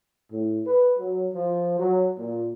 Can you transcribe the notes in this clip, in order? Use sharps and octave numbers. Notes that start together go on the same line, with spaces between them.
A2
B4
F#3
F3
F#3
A#2